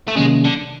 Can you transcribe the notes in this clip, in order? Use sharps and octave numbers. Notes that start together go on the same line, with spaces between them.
A3
C3 D#3 F#3 G#3 A#3 C#4
D3